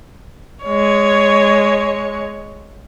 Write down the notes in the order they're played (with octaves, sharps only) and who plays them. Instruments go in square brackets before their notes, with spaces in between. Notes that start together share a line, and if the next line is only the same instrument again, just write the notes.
[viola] G#3 C#5